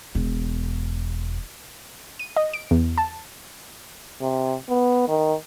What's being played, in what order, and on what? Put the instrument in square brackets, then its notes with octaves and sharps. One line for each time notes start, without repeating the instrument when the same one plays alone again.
[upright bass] E1 E2
[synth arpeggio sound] D#7
D#5
D7
E2
A5
[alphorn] C3
B3
D#3